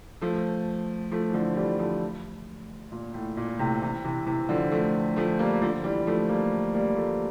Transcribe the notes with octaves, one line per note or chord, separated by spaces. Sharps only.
F3 A3
F3 A3
E3
D3 F3
E3 G3
F3 A3
A#2
A2
A#2
A2 C3
C3 E3
C3 E3
C3 E3
D3 F3
F3 A3
F3 A3
G3 A#3
D3 F3
E3 G3
F3 A3
G3 A#3
G3 A#3
F3 A3